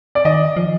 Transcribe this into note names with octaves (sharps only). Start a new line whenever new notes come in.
D5
D#3 D#5
F3